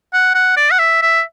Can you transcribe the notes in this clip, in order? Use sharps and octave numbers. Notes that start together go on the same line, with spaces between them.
F#5
F#5
D5
F#5
E5
E5